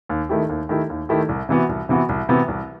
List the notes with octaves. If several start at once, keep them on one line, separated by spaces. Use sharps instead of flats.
D#2
D#3 A3 E4 G4
D#2
D#3 A3 E4 G4
D#2
D#3 A3 E4 G4
C2
C3 E3 B3 F#4
C2
C3 E3 B3 F#4
C2
C3 E3 B3 F#4
C2